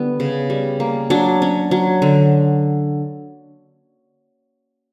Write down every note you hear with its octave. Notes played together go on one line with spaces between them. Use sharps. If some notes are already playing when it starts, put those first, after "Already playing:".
Already playing: D3 G3 B3 E4
C#3
G3
A#3
F#3 D4
C#4
F#3
D3